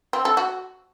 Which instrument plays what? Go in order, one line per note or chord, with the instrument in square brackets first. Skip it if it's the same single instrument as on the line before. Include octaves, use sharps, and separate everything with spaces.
[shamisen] C4
A4
F#4